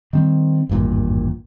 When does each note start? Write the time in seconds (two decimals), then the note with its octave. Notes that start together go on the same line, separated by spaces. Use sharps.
0.13 D#3 G3 C4
0.69 G#1 E2 G2 A#2